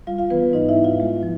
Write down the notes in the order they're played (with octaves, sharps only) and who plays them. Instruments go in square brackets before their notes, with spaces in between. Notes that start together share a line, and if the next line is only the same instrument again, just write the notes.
[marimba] G3 F4 F5
F4 F5
E3 B3 B4
G#2 D#4 D#5
E4 E5
G#2
F4 F5
G#3
F3